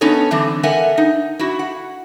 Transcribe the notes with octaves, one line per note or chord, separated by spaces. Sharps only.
B3 C#4 D#4 A4 C#5
D3 E3 G3 C4
A4 A#4 E5 F#5 G#5
D#4
E4 F#4
F#5